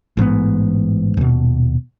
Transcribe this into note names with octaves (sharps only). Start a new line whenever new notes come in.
A1 G#2 C#3 B3
D#1 B2